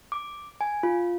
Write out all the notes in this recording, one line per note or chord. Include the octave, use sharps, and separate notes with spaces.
D6
G#5
F4